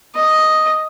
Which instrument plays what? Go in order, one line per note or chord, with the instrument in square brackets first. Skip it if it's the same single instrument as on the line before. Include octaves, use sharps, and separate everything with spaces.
[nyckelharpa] D#5